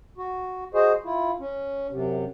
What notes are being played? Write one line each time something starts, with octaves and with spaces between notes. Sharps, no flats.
F#4
F#4 G#4 C5 D#5
E4 F4
C#4
F#2 C3